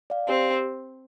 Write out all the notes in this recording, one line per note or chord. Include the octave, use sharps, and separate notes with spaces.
D5 F5
C4 G4